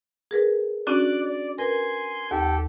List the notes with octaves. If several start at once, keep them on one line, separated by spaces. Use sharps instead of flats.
G#4 A#4 B4
C#4 D4 F#4 D5 D6 F#6
D5
A#4 B4 G#5 C6
D#2 G4 A4